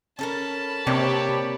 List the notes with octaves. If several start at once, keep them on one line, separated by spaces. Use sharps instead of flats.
C#4 A4 A#4 A5 B5
C3 A#3 C4 D4 G4 C#5